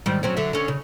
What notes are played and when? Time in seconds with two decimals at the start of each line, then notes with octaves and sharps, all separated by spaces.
0.06 G#2 D#3 G3
0.23 F#3 C4 C#4
0.37 D3 F#3 E5
0.53 D3 C#4
0.68 C#3